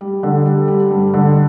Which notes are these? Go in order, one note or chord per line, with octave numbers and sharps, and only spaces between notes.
G3
D3
G3
G3
G2
D3